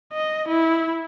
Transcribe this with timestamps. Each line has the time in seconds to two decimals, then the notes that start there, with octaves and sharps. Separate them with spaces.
0.13 D#5
0.49 E4